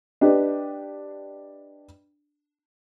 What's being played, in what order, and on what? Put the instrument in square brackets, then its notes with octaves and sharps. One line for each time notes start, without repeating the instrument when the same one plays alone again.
[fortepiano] D4 G4 B4 D#5